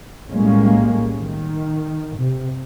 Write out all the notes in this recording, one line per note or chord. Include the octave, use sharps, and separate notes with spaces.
B1 A2 G3 G#3 A#3 C#4
D#3
C3